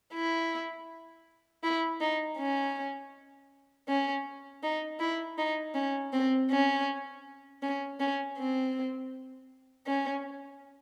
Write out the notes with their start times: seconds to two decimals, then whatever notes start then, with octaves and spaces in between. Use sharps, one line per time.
0.14 E4
1.63 E4
2.01 D#4
2.38 C#4
3.89 C#4
4.64 D#4
5.00 E4
5.38 D#4
5.75 C#4
6.13 C4
6.51 C#4
7.62 C#4
8.00 C#4
8.38 C4
9.87 C#4